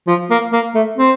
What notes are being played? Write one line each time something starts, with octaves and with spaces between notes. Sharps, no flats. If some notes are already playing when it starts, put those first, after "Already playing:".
F3
A#3
A#3
A3
C4